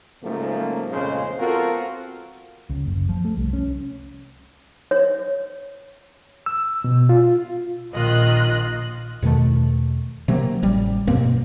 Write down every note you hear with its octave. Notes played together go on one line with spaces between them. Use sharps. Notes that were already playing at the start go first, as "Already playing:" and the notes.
G#2 C#3 F3 F#3 A3 A#3
F2 A#2 C#3 G#3 F4 C5
B3 C4 F4 F#4 A4 A#4
C#2
F#1
F3
A3
C2
C#4
C#5
E6
B2
F4
A#1 D#3 F4 D#5 F#6
E2 B2 D#3 A3
C3 F#3 A#3
A1 G3
G2 B2 A#3 C4